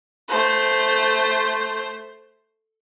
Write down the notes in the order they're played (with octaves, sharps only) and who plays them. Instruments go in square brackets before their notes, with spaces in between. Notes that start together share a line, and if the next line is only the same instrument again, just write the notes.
[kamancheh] A3 C5